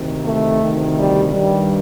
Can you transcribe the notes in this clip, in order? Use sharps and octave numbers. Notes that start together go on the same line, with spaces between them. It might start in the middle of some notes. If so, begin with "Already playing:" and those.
Already playing: D2 C3 D#3
A3
D2 C3 D#3
G3
G2 D#3 G3